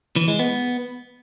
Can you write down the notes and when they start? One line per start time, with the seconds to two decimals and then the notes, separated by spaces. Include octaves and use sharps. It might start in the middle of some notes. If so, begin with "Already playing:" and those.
0.16 E3
0.28 G#3
0.39 B3